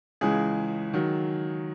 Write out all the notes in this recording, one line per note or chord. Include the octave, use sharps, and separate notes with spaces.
C#2 C#3 E3 G#3 G#4
D#3 F#3